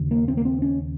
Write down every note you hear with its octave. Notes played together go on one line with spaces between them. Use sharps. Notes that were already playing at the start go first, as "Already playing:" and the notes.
Already playing: D#2 C#3
A#3
C4
A#3
C4
C#4